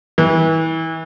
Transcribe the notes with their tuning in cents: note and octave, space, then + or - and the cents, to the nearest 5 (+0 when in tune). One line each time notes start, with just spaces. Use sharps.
E3 -30